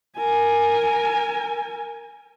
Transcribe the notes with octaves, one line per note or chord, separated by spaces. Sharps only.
A#4 G#5